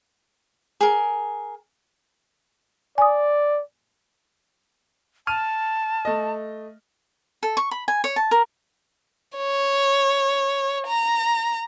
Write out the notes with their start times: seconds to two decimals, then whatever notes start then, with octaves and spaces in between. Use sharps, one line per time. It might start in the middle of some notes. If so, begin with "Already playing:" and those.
0.81 G#4 A#4
2.98 D5 G#5 D#6
5.27 A5 F6 D#7
6.05 A3 D#5
7.43 A4
7.57 C#6
7.71 B5
7.88 G#5
8.04 C#5
8.16 A5
8.31 A#4
9.37 C#5
10.87 A#5